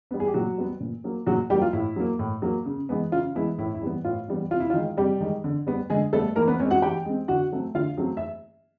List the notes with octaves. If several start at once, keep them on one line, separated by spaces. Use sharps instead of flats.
G3 B3
G#4
G4
A#2 F#3 F#4
G3 B3
A#2
F#3 A#3
A#2 F#3 F#4
F#3 G3 A#3 G4
F4
A2 E4
F#3 A#3
A2
F#3 A#3
C#3
E3 G#3 B3
C#3 F4
E3 G#3 B3 E4
A2 E4
E4
E3 G3 B3
A2 F4
E3 G3 B3
C3 F4
E4
F4
D#3 G#3
C3 G3 G4
D#3 G#3
D3
G3 B3
D3 G#3 G#4
G3 A3 B3 A4
E3 A#3 A#4
B3 B4
G#3 C4 C#4 C#5
F#4 F#5
E3 G4 G5
G#3 C4
D3 F#4 F#5
F#3 A3 C4
D3 F4 F5
F#3 A3 C4
E5